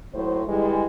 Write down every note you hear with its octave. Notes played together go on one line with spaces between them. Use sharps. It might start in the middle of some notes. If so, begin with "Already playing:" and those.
D#2 A2 F#3 C5
D3 E3 G3 G#3